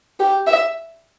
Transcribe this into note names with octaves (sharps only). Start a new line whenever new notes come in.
G4
E5